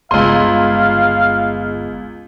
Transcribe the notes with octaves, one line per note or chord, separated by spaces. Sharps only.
G1 C#2 D3 B3 G#4 D#5 F5 C6